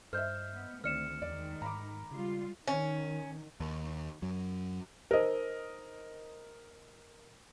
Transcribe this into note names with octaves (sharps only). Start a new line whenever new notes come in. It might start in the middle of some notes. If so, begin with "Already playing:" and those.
G2 C5 D#5 E5 F6 G6
B3
D2 D#3 C4 D5 F6 C#7 E7
E2 D#3 G#3 D5
G#2 A#5 B5 D6
C#3 G3 G#3 F4
D#3 C#4
D#2
F#2 F#3
D#4 A#4 C5 D#5 E6